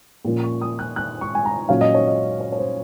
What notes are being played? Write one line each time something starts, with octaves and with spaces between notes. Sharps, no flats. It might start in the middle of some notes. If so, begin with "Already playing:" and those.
A#2 F3 A#3 C#4
C#6
D#6
F#6
F#6
C#6
G#5
A#5
A#2 F#3 C#4 F5
D#5
C#5
D#5
C#5
C#5
C5